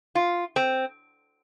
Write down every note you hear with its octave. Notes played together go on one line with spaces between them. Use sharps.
F4
C4